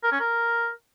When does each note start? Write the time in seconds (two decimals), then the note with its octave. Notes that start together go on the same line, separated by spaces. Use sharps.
0.03 A#4
0.12 C#4
0.20 A#4